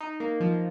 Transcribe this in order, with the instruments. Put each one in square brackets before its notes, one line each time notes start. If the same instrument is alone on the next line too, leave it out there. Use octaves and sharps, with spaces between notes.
[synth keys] D#4
A#3
F3